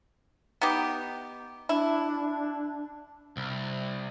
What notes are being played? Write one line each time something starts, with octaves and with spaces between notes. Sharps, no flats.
B3 D#4 G4
D4 E4
C2